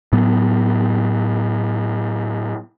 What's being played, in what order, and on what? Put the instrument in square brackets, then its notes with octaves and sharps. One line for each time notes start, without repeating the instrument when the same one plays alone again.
[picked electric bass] A2 F#3 B3